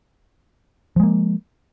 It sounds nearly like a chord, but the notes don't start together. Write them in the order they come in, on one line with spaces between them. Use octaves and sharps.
F3 G#3 A#3